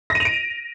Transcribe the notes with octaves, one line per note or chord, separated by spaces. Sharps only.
A#6
D#7
F7
D7